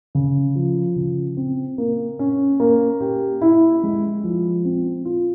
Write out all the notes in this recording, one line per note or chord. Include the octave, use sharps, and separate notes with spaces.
C#3
F3
C#3
C4
A#3
C#4
A#3
G4
E4
G#3
F3
C4
F4